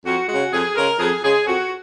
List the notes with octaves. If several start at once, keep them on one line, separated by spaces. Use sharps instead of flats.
F2 F#4
C#3 G#3 F#4
F2 G#4
C#3 G#3 A#4
F2 G#4
C#3 G#3 G#4
F2 F#4